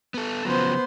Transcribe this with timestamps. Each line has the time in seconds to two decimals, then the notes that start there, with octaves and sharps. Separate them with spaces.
0.14 B3 A4
0.45 C#3 F3 F#3 B3 C5